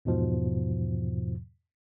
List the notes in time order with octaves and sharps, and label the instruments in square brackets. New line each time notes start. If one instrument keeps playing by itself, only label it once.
[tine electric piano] E2 G#2 B2 F3